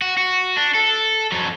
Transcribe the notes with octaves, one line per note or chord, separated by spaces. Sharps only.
F#4
F#4
D4
A4
F2 F#3